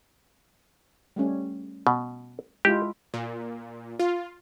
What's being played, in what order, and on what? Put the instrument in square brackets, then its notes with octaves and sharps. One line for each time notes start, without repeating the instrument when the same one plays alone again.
[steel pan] G3 A3 C#4
[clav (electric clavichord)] B2
[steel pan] G#3 E4 F4 [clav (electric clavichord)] G4
[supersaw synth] A#2
F4